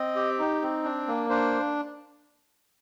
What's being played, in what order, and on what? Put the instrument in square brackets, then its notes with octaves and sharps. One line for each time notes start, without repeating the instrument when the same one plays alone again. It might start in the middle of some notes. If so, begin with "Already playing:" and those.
Already playing: [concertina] C4 D#5
G4
D#4
C4
D4
A#3
D4 C5